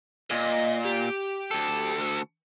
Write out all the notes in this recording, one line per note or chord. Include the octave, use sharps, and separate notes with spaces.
A#2 D#5
G4
D2 A4